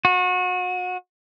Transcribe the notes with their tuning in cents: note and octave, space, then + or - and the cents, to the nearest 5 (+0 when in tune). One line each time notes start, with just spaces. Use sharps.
F#4 -30